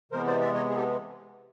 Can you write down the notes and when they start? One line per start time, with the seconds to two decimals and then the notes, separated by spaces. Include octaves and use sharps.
0.12 C3 E3 G#3 B3 A#4 C5
0.26 C5 D5
0.41 D5 E5
0.54 C#5 D#5
0.70 G#4
0.76 G4 A4